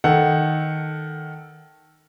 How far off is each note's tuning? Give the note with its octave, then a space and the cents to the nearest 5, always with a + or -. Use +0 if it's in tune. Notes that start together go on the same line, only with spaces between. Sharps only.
D#3 +0 A4 +0 F#5 +0